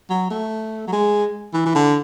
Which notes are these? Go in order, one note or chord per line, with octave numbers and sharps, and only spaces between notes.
F#3
A3
F#3
G#3
E3
E3
D3